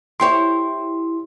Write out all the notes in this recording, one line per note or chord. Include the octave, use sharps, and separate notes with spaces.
E4 G4 C#5 C6